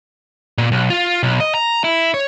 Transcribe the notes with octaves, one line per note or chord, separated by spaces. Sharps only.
A#2
B1
F4
B1
D#5
A#5
E4
C#5